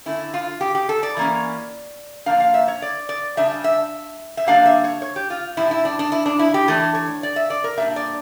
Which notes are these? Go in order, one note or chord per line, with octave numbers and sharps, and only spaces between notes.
D3 A3 C#4 E4
F4
G4
G4
A4
D5
E3 A#3 C#4
A#2 F3 A#3 D4 F5
F5
E5
C#5
D5
D5
C#3 G3 D4 E5
E5
E5
D3 G3 A#3 D4 F5
E5
C#5
C#5
G4
F4
A2 G3 D4 E4
E4
D4
D4
E4
D4
E4
G4
E3 A3 D4 A4
C#5
D5
E5
D5
A#4
A#2 G3 D4 E5
D5